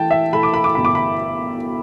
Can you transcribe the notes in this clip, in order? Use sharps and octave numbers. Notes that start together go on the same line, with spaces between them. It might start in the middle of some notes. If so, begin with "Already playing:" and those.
Already playing: E3 A3 G5 A5
E5
A3 B5
D6
B5
D6
G1 B5
D6
B5